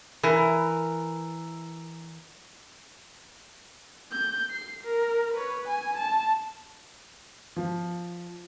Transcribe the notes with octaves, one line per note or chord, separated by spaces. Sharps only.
E3 A#4
G6
C7
A#4
B4 C#5
G#5
A5
F3